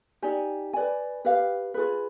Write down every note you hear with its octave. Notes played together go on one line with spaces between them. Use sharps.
D#4 G4 D5 G#5
B4 D5 G#5
G4 B4 F5
F4 G#4 B4